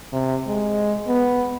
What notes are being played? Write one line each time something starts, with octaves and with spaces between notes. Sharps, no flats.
C3
G#3
B3